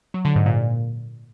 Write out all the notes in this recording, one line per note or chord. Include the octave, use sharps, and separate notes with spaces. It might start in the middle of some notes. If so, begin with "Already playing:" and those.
F#3
D3
G#2
A#2